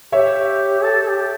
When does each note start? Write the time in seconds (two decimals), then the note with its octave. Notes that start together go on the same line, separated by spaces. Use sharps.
0.12 G4 C#5 E5
0.83 A4
1.02 A4
1.07 G4